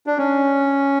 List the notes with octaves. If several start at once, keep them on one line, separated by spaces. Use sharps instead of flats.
D4
C#4